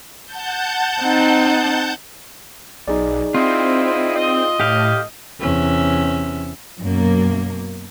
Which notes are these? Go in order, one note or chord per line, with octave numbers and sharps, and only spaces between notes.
F#5 A5 G6
C4 D#4
B1 D#4 G#4 D5
C4 E4 F4 D#5
D#5
A2 G4 F5
E2 C3 C#4 E5
F#2 B2 F#3 A#3